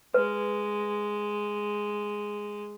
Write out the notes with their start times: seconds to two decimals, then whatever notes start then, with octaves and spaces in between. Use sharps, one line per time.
0.14 G#3 B4